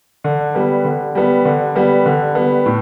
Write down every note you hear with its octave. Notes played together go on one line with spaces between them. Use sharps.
D3
G3 B3
D3
G3 B3
D3
G3 B3
D3
G3 B3
A2